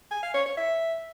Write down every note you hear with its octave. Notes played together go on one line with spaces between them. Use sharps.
G#5
F5
C#5
C#5
E5